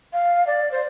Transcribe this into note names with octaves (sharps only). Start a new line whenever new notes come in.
F5
D5
C5